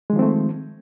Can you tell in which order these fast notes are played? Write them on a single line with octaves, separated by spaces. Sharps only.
G#3 D#3 F3 C4 A3